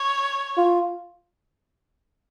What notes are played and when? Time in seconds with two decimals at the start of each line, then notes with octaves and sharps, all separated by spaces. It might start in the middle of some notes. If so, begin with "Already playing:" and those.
Already playing: C#5
0.57 F4